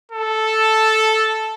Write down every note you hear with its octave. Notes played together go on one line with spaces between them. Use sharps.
A4